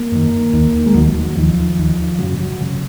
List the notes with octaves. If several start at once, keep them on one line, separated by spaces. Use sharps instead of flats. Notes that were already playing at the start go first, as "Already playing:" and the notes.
Already playing: A#3
F#2 D#3
D#2 D#3
G#3
D#2 D#3 F#3
F#3
F#3
D#2 D#3 F3
D#2 D#3
F#2 C#3 F#3
F#3
C#3